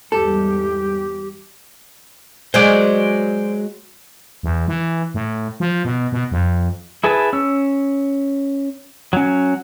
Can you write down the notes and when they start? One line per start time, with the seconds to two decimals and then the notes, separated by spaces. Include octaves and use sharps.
0.12 E2 G#2 G3 G4 A4
2.54 F#3 G#3 C5 D5
4.43 E2
4.68 E3
5.14 A2
5.60 F3
5.85 B2
6.12 B2
6.31 F2
7.04 E4 G#4 B4 A5
7.33 C#4 E6
9.13 F#3 C#4